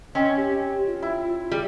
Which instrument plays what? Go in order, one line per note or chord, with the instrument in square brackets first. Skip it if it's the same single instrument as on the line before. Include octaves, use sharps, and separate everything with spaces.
[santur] C4 [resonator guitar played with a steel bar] C#4 [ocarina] D#5
[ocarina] G4
F4
[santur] E4
[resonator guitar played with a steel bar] G3 [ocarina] G#4